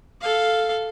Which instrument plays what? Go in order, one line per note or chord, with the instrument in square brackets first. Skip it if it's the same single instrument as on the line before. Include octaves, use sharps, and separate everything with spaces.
[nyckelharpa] A4 F5